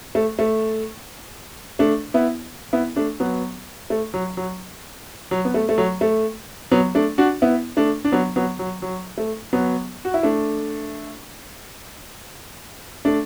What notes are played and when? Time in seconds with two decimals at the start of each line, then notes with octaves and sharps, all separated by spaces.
0.15 A3
0.39 A3
1.79 A3 D4
2.14 B3 E4
2.73 B3 E4
2.96 A3 D4
3.20 F#3 B3
3.90 A3
4.14 F#3
4.37 F#3
5.31 F#3
5.45 B3
5.54 A3
5.69 A3
5.78 F#3
6.01 A3
6.72 F#3 B3
6.95 A3 D4
7.18 D4 F#4
7.42 B3 E4
7.77 A3 D4
8.05 D4
8.12 F#3 B3
8.36 F#3 B3
8.59 F#3
8.82 F#3
9.18 A3
9.53 F#3 B3
10.05 F#4
10.14 E4
10.23 A3 D4
13.05 A3 D4